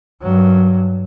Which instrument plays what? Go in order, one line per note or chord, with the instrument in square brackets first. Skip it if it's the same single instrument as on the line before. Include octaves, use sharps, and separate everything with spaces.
[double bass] G2 F#3